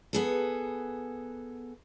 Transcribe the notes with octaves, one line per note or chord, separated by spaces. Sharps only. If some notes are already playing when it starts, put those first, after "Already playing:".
B3 G#4 A4